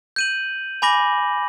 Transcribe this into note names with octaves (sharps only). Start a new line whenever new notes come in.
G6 D#7 F#7
G#5 B5 D6 A#6 F#7